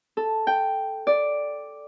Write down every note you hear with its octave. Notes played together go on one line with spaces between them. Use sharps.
A4
G5
D5